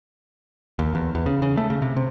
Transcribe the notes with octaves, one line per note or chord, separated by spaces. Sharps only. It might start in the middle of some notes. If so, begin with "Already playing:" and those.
D#2
E2
E2
C#3
C#3
A3
C#3
C3
C3